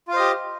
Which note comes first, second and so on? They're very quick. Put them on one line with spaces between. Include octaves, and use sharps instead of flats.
F4 F5 C5 D#5 G4